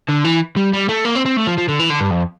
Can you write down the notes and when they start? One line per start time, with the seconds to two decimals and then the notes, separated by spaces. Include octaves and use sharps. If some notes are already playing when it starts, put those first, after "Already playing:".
0.09 D3
0.24 E3
0.56 G3
0.73 G3
0.89 A3
1.05 A#3
1.15 C4
1.26 C4
1.37 A3
1.47 F3
1.58 F3
1.68 D3
1.79 E3
1.90 D3
2.00 G2
2.10 F2